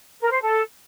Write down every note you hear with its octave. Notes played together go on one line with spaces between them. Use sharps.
A#4
C5
A4